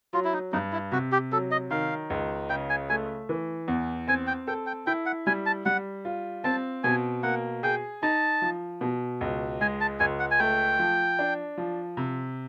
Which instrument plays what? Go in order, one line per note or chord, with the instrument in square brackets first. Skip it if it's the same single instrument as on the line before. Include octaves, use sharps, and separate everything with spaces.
[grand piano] F#3 [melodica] F4
[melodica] E4
D#4
[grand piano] G2 [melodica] D#4
[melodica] E4
[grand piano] C3 [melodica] F#4
[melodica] G4
[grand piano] F#3 [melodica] A4
[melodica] D#5
[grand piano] D#3 [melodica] F5
[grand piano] C#2
[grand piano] C#3 [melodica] G5
[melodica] G#5
[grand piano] A3 [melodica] G#5
[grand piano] E3
E2
[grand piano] C4 [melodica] G#5
[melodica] G5
[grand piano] A4 [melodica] G5
[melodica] G5
[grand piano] E4 [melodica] G5
[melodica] F#5
[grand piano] G3 [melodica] G#5
[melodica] A5
[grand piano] G3 [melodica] F#5
[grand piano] F4
[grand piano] C4 [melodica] A5
[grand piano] B2 [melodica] G#5
[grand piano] A#3 [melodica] F#5
[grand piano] G#4 [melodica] G5
[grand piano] D#4 [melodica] A5
[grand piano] F3
B2
C#2
[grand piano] G#3 [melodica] G#5
[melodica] A5
[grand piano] C#2 [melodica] G#5
[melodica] F#5
G#5
[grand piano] A3 [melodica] G5
[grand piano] F3
D4
F3
C3